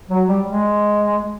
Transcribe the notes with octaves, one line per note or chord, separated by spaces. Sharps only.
F#3
G3
G#3